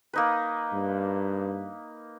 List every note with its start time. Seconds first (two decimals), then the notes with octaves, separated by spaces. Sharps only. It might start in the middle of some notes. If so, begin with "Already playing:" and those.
0.13 A#3 D#4 B4
0.73 G2